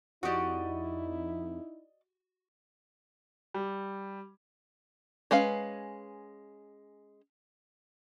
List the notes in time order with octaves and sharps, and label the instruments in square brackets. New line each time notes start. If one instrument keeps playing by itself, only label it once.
[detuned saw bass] F2 [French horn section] D#4 E4 [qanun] F#4 G4 [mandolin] D5 D#5 C#6
[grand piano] G3
[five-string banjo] G#3 C#4 B4 F5